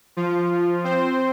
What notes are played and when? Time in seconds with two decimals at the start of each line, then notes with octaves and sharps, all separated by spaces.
0.17 F3 F4
0.84 C4 C5